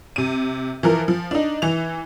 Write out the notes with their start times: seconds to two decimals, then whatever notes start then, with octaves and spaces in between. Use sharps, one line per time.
0.16 C3 D#7
0.83 E3 F3 A#4
1.08 F3
1.31 D4 D#4
1.62 E3 F7